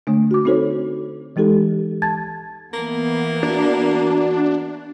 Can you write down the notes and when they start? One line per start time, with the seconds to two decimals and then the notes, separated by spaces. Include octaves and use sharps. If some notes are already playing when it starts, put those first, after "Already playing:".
0.07 D3 A3 D4
0.31 F#4 D6
0.45 C4 D#4 F#4 A4 C5 C#5
1.36 E3 G#3 D#4 G4 A4
2.02 A5 G#6 A6
2.73 E3 A#3 B3
3.43 D4 F#4